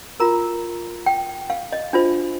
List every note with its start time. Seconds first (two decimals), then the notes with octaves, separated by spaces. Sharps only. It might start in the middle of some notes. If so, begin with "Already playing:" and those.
0.20 F4 A#4 A#5
1.06 G5
1.50 F5
1.72 D#5
1.93 D4 F4 C5